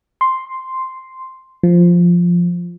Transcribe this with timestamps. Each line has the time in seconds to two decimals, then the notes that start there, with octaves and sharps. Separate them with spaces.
0.21 C6
1.63 F3